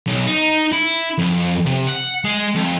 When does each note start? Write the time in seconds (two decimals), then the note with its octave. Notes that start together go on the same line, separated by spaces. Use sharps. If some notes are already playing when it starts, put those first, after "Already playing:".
0.07 B1
0.27 D#4
0.72 E4
1.18 F2
1.66 C3
1.87 F#5
2.24 G#3
2.56 F2